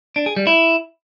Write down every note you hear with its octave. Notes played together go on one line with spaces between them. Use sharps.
D4
G#4
G3
E4